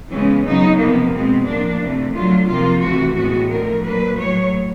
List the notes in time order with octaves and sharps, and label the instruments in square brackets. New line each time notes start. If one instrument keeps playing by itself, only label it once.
[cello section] C#3 E3 G#3 B3 C#4
C#3 F#3 B3 D#4
C3 F3 A#3 B3
B2 G#3 B3 C4
A2 F3 A#3 D4
C3 E3 A3
D3 F#3 A3 F4
C3 F3 A#3 F4
C3 E3 A3 F#4
A2 E3 G#3 B3 F#4
D3 F3 A3 A#4
A#2 F#3 A#3 B4
A2 F#3 A3 C#5